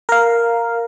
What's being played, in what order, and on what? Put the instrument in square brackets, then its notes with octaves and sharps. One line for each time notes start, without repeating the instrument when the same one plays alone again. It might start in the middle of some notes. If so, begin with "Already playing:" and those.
[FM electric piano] A#4 F5